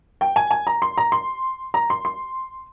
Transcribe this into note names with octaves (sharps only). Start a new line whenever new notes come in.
G5
G#5
G#5
A#5
C6
A#5
C6
A#5
C6
C6